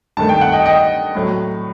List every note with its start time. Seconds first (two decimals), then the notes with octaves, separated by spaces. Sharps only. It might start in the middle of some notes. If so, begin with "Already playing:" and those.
0.17 G2 D#3 A3 A5
0.29 G5
0.41 F#5
0.52 D#5 G5
0.66 D#5 G5
1.15 A2 F#3 A3